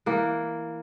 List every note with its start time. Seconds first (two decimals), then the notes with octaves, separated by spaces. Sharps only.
0.06 E3 A#3